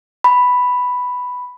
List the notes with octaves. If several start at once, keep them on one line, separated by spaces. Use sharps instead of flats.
B5